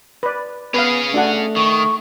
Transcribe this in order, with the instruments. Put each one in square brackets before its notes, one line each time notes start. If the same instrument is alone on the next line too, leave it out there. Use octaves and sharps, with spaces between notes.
[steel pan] B4 D5
[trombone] B3 [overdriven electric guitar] C#4 G#4 [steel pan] B4 F5
[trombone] A3 [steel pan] D4 F#4 F#5
[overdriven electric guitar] D#3 [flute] C#6